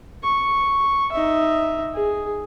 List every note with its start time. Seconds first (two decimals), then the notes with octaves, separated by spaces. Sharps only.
0.23 C#6
1.12 D#4 E5
1.94 G#4